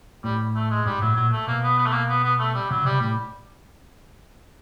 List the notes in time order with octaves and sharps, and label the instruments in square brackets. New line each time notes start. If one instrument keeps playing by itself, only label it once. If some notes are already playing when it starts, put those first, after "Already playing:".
[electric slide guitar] A2 [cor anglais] G3
[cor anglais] A3
G#3
[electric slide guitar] G#2 [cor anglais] G3
[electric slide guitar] A2 [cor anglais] F#3
[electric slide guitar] A#2 [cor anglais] F#3
[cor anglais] A3
[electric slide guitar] B2 [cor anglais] A#3
[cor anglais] B3
B3
A3
A#3
B3
B3
A3
G3
[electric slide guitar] C#3 [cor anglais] F#3
[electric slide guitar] C3 [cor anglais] G3
[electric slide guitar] A2 [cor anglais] G3